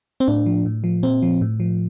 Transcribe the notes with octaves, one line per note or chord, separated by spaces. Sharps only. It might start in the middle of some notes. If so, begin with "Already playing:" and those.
C4
A2 D4
F3
A2
F3
A#2 C4
F3
A2
F3